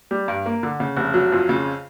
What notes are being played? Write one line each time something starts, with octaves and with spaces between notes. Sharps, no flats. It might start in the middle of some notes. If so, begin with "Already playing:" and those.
G3
G2
A#3
D3
C#3
F1
F#3
F2
C#3